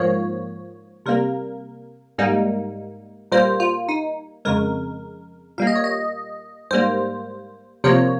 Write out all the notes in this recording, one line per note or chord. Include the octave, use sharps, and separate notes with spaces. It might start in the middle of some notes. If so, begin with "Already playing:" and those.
Already playing: G#2 F3 A#3 C#5
C3 G3 A#3 A#4
G#2 G3 A#3 D#4
A#2 G3 A#3 C5
F4
D#4
F2 C#3 G#3 A#4
A#2 G3 A#3 F5
D#5
C#5
D#5
G#2 G3 A#3 C5
C3 F3 A#3 C#5